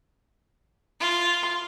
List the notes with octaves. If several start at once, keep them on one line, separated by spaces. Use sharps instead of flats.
F4